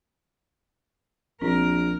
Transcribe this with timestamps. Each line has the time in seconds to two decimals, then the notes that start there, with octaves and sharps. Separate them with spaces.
1.41 A#1 C4 A#4